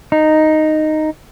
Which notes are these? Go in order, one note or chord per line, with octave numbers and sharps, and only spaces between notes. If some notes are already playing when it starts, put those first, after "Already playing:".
D#4